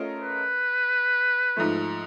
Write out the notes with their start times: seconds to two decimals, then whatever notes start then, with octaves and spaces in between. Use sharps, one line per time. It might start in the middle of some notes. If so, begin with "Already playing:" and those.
Already playing: A3 C#4 F4 A#4 D#5
0.22 B4
1.57 G#2 F3 A3